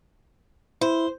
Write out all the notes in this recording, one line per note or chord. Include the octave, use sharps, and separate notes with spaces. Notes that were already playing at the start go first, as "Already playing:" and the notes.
E4 C5